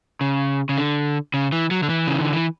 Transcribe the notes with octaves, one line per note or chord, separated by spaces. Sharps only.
C#3
C#3
D3
C#3
E3
F#3
D3
E3
C#3
D3
E3